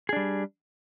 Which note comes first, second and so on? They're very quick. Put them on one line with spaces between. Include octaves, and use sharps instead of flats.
G#4 D4 G3